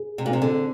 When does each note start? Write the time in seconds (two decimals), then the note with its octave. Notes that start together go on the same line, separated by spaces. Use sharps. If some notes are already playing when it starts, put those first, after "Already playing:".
Already playing: G#4
0.18 C3
0.26 A#2
0.30 C3 C4
0.42 D3